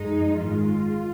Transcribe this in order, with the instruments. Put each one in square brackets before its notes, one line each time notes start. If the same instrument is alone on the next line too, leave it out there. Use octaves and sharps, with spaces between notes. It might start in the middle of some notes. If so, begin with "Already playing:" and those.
Already playing: [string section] F#2 F3 G#3 D#4
G#1 G#2 D#3 G#3 F4